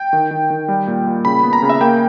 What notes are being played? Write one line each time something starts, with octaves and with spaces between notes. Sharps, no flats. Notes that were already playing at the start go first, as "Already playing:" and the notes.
Already playing: G5
D#3
D#3
D#3
G3
A#2
A#2
C#3 B5
B3
A#5
C#3
E5
A#3 G5